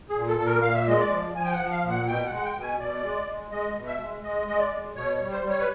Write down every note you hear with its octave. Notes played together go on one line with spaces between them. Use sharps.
G#4
A#2
A4
A#2 A4
A#4
A#2 F5
E5
G#3 D#5
D5
F3
F3 G#5
G5
F#5
F3
F5
A#2
F#5
B2 G5
F#5
G#3
F#5
G5
B2
G#5
B2 D5
G#3
G#3
G#3 D#5
B2
E5
G#3
G#3 D#5
G#3 D#5
D5
G#3
B2 C#5
C#5
G3
C5
G3
C#5
B4